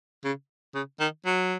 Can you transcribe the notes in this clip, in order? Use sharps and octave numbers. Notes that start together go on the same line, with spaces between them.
C#3
C#3
D#3
F#3